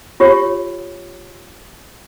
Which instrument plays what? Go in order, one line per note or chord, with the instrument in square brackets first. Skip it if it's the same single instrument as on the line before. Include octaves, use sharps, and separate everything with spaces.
[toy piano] F4 G4 C#5